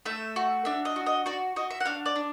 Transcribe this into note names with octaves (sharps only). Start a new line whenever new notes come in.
A3 E5
F#4
D4 E5
D#5
F#4
D#5
F#4 D5
F#4 D#5
E5
F#5
D4 F5
D5
D4